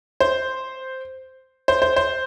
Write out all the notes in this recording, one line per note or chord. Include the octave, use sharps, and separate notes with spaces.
C5
C5
C5
C5